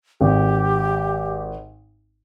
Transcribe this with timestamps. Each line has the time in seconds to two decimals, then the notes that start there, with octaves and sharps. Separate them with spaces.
0.21 G#1 G4